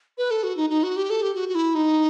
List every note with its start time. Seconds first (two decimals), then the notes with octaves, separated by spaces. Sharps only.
0.18 B4
0.31 A4
0.43 F#4
0.57 D#4
0.70 D#4
0.83 F#4
0.97 G4
1.10 A4
1.22 G4
1.35 F#4
1.49 F#4
1.55 E4
1.75 D#4